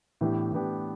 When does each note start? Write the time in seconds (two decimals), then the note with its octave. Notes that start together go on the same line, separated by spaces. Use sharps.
0.21 A2 E3 B3 D4 G4
0.52 A2 E3 B3 D4 G4